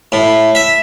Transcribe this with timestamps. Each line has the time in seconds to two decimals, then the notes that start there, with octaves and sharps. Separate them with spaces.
0.12 A2
0.55 E5